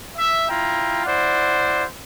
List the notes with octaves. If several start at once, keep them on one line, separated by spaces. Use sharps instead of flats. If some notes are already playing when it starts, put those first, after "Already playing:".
E5
E4 F4 G5 A#5
E4 C5 D5 F#5